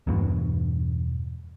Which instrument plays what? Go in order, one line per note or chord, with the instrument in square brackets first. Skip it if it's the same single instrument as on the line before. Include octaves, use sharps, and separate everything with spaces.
[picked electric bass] E2 G2 B2